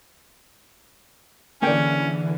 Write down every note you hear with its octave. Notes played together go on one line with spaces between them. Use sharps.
D3 E3 A3 A#3 C#4 G#4 D5 G5